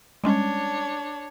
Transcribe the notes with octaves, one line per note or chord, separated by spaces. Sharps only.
G3 G#3 C#4 D4 C#5